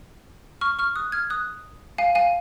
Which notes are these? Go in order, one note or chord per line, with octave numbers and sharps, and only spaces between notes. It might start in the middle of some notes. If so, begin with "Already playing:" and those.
C#6 F6
C#6 F6
D#6 F#6
F6 G#6
D#6 F#6
F5 G#5
F5 G#5